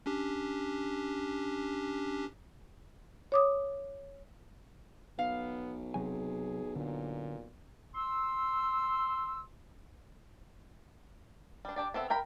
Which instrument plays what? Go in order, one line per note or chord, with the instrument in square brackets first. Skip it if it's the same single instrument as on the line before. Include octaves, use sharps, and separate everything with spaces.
[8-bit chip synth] C#4 D4 G4
[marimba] C#5 D6 D#6
[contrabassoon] B1 [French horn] B3 [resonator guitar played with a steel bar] F5
[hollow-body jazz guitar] C3 F#3 G#5 [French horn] G#4
[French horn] A#2 [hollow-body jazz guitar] D3
[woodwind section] C6 E6
[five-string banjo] G3 D4
D4 G4 D5
B3 C4 A4 E5
A#4 G5 A#5 B5